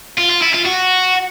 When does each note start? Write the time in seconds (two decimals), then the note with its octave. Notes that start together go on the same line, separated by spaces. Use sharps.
0.18 F4
0.29 F4
0.41 E4
0.53 F4
0.65 F#4